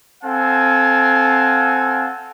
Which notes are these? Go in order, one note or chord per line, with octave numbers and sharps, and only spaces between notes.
C4 A4 F5 F#5 G#5